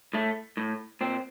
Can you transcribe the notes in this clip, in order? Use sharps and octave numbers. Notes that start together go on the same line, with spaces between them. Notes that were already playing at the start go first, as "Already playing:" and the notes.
A2 A3
A2
A#2 C4